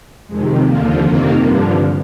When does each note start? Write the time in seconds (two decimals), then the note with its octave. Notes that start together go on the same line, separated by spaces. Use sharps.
0.28 F2 C3 D#3 G#3
0.65 D#2 D3 F3 A#3
1.03 F2 C3 D#3 A#3
1.40 G2 D3 F3